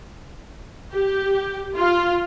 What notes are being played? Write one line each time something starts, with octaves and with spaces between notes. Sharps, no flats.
G4
F4